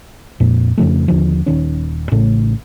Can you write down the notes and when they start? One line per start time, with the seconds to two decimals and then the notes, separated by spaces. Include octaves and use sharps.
0.40 F2 A#2
0.78 F2 C#3 F3 A3
1.08 D#2 D3 F3
1.46 D#1 D#3 C#4
2.12 A1 A2 C#3 A3